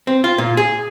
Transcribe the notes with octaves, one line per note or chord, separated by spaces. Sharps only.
C4
F4
A#2
G#4